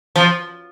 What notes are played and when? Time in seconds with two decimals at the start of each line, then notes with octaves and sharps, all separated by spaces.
0.16 F3